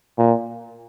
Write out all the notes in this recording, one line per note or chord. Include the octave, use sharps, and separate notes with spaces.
A#2